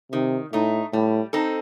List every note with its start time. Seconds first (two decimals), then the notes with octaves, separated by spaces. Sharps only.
0.12 C3 D#3
0.53 A2 A3 D#4
0.93 A2 G3
1.33 C4 D#4 A4